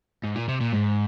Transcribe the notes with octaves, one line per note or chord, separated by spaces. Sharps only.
G#2
A#2
C3
A#2
G#2